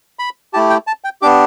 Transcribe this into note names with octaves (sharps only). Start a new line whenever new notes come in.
B5
A3 E4 G4 A5
G5
A5
G5
B3 D4 G4 D6